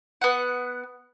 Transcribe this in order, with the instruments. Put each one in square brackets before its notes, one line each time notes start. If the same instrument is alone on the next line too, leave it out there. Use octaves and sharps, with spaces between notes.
[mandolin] B3 F#5